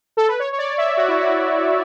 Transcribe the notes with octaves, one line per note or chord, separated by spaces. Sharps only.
A4
B4
C#5
C#5
D5
E5
F#4
E4
F#4